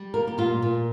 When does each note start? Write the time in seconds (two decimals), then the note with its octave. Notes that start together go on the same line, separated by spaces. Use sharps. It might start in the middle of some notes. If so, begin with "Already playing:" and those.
Already playing: G3
0.14 A#3 A#4
0.27 G4
0.38 A#2 F4
0.62 A#2